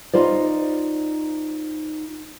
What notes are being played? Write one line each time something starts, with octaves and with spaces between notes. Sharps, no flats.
D#4 F4 C5 D5